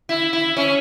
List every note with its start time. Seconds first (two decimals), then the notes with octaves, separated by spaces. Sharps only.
0.09 E4
0.33 E4
0.57 C#4